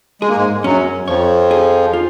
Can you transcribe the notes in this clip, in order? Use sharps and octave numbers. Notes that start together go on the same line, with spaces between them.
G#3 G#4
A#3
G#2 G#3
F#2 F#3 C#4
F2 F3 C#5
G#4
F4